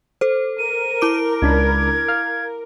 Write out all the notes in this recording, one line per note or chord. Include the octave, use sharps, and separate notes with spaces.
A4 C5
A#4 D#7
E4 D6 D7
C#2 D4 B5 G#6
F5